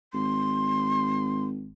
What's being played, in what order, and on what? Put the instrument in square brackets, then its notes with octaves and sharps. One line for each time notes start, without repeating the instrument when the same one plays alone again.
[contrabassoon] G#1 [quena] C6